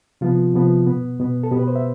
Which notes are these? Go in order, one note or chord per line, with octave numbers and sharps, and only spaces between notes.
C3 F3 B3 F4
C3 F3 B3
B2 B3
B2 B3
A4
B2 B3 G4
B4
C5
E5